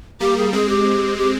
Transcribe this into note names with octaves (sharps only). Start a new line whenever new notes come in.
G3 A#3 G4
G#4
G#3 C4 G#4
G4
G4